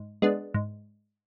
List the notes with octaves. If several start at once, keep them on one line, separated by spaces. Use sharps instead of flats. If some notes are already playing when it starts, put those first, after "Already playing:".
Already playing: G#2
G#3 B3 D4
G#2